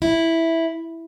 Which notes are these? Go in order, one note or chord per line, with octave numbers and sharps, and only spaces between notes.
E4